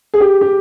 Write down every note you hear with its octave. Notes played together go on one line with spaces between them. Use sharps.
G#4
G4
G4